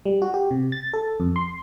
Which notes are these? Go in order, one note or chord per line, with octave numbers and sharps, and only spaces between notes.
G3
F#4
G4
C3
A6
A4
F2
C6